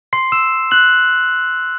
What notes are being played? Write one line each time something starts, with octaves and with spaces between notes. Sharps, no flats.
C6 C7
E6 E7
F#6 F#7